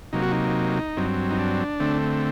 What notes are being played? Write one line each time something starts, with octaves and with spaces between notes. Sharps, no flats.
C3 F#3 A#3 D#4
F#4
D#4
G2 F#3 C4
D#4
D4
D3 A3 C4